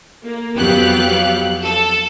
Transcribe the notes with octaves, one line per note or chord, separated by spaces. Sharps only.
A#3
F2 F#3 B3 G4 F5 F#6
A4